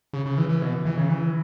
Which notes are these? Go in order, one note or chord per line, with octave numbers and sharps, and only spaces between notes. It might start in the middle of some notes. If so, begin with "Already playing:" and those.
C#3
C#3
E3
E3
B2
E3
C#3
E3